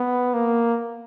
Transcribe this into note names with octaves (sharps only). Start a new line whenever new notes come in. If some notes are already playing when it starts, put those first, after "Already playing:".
Already playing: B3
A#3